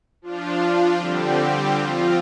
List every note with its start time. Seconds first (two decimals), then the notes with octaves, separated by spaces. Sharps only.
0.22 F3 D4 F4
0.98 D3 G3 C4 G4
1.73 F3 C4 F4